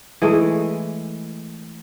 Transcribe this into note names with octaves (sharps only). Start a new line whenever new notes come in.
E3 G#3 A3